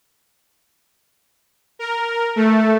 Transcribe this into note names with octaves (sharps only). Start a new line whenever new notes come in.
A#4
A3